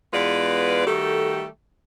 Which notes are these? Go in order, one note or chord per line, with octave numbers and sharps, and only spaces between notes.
E2 G#3 B3 F4 B4 D5
D#3 G3 A3 F#4 G4 A4